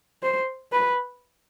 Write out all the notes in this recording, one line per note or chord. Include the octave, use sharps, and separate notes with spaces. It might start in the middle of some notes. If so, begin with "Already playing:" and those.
C5
B4